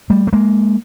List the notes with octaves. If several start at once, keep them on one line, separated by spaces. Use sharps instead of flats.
G3 A3
A3
G#3 A#3